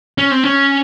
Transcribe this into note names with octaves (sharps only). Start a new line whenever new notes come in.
C#4
C4
C#4